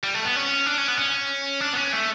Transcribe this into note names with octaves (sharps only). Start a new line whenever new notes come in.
G3
A3
B3
C#4
D4
C#4
B3
C#4
D4
B3
C#4
A3